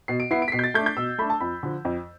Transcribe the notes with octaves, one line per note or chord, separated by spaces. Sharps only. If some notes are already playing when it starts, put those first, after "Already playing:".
B2 C7
D7
B3 E4 C7
D7
B6
B2 C7
G6
A6
A3 D4 G6
G6
B2 E6
A3 D4 B5
A5
F2 B5
D3 F3
F2